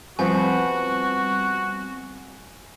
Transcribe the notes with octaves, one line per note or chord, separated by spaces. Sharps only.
F3 G3 B3 C4 F#4 G#5